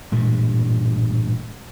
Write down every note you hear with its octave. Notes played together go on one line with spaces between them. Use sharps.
A1 G2 A#2 G#3